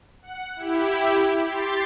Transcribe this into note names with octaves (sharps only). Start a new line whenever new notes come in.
F#5
E4 G4
G4 C6 A6